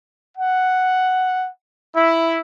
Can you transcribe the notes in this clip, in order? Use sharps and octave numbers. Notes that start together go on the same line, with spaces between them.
F#5
E4